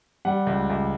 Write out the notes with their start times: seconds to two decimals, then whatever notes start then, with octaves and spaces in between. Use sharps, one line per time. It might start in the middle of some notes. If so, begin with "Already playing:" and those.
0.25 G3 F#5
0.47 C#2
0.70 C#2